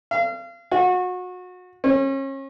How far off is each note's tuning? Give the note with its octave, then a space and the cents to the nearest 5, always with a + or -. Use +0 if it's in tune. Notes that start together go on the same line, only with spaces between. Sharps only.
F5 -35
F#4 -30
C#4 -35